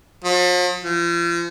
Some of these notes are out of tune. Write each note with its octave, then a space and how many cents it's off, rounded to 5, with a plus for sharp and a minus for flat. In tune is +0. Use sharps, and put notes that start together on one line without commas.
F3 +45
F3 -40